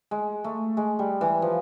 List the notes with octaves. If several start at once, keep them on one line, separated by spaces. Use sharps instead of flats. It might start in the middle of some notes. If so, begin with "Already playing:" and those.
G#3
A3
G#3
G3
E3
F3